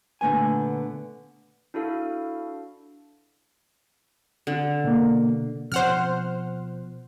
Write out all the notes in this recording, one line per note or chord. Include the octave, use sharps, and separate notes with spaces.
A#2 D3 A3 B3 G#5
D4 E4 F#4 A4 F5
D3
B2 A#3
B2 F3 C4 C5 F#5 F6